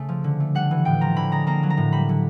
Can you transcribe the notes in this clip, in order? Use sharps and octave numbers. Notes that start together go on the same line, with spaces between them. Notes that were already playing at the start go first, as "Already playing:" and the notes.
Already playing: C#3 A3
F3
D3
A3
G3 F#5
E3
A2 G5
F3 A#5
D3 B5
G#3 A#5
A#3 A#5
F#3
A#5
A2
G3 B5
D3